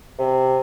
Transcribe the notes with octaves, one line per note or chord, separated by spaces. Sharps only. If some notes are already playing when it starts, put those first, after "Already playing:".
C3